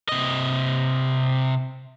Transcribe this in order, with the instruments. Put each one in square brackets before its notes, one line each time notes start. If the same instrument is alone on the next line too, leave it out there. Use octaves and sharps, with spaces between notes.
[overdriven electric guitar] C3 D#5